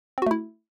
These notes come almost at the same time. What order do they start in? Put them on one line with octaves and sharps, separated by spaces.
C4 F#4 A3 E4